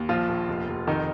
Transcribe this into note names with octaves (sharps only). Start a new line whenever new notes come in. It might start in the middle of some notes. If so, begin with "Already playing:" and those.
Already playing: D#2
A#1 F3 F4
A#1
F1
F1
F2 D#3 D#4